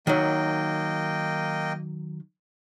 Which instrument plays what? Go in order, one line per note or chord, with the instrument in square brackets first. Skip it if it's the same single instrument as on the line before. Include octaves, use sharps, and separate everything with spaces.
[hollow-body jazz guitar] D#3 F#3 [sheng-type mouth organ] A#3 D#5 G5